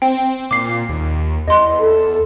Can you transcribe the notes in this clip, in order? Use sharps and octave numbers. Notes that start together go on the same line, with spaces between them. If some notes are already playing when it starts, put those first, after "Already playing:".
C4 G5
A#2 D6 C7
D#2
E2 D#5 C6
A4
E2